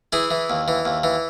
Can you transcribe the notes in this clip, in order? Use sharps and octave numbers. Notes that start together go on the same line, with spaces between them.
E3 E4 G#4
E3
D#2
E3
D#2
E3